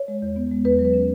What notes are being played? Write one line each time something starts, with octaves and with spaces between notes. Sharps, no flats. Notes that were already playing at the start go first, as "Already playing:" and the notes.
Already playing: C#5
G#3
E2
B3
G#3
E2 B4
F#3
B4
C#4